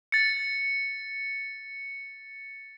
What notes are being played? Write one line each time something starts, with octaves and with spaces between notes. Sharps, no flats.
A6 C#7